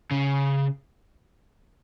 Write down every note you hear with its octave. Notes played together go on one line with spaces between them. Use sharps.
C#3